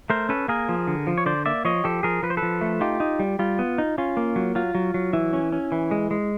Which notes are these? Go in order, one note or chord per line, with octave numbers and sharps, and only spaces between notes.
A3 A#4 C5
C#4 A4 B4
A#3 G#4 A#4
F3
D3
F3
C#5
D3 C5 D5
A#3 D5 E5
F3 C#5 D#5
F3 G4 A4
F3 G#4 A#4
F3 B4
C5
A4 B4
F3
A3
D#4 F4 G4
D#4
G3
G3 F4
B3
D#4
C#4 F4
A#3
F#3
F#3 F4
F#3
F#3
E3 E4
C#4
C#4
E3
G#3
G#3